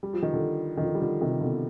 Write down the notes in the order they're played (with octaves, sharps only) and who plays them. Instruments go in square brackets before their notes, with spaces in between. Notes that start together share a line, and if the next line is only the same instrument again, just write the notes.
[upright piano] G3
F3
D#3
D3 F3
D#3
D3 F3
G3
D3 F3
C3 D#3
B2 D3